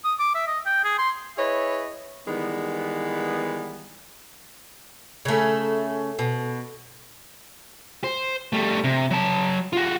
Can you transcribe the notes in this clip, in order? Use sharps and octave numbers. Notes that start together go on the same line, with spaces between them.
D#6
D6
E5
D#5
G5
G#4
C6
E4 G#4 B4 C#5 D#5 E5
D#3 E3 G3 G#3 B3
C#3 A3
B2
C5
G3 A3
C3
F#3 A5
F4 F#4